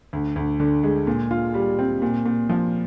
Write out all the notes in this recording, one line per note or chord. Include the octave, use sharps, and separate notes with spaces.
D2
D2
D3
G#3
A#2
F4
G3
C4
A#2
A#2
F3